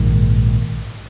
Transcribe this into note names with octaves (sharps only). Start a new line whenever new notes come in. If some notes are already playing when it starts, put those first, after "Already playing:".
Already playing: A#1 G#2 D#3